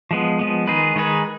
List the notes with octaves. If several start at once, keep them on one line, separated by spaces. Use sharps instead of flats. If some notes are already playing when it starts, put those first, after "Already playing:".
F3 G#3 B3
F3 G#3 B3
D#3 G#3 D#4 G#4 B4
D#3 G#3 D#4 G#4 B4